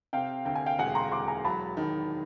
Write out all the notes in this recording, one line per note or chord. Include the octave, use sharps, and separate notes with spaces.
C3 F5 G5
D2 G5
G#5
F5 G5
E1 F#5 G#5
A#5 C6
E1 C6 D6
G#5 A#5
F#3 A5 B5
D#3